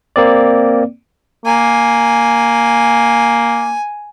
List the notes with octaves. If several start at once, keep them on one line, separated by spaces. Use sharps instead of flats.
A#3 C4 D5
A#3 G#5